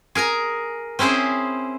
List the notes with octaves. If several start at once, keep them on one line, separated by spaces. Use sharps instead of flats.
G#4 A#4 G#5 A#5
C4 C#4 E4 G#4 C5